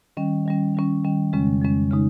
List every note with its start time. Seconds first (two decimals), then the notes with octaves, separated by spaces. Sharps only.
0.17 D#3 G3 C#4
0.46 D#3 G3 C#4
0.75 D#3 G3 C#4
1.05 D#3 G3 C#4
1.33 F2 C#3 G#3 C#4
1.62 F2 C#3 G#3 C#4
1.91 C#3 G#3 D#4